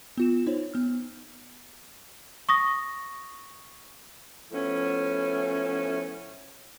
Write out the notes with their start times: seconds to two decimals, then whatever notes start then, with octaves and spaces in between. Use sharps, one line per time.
0.17 B3 F4 E7
0.47 D#4 C5 C#5
0.74 B3 F6
2.49 C#6 D#6 A#6
4.52 F3 A3 B3 C#4 E4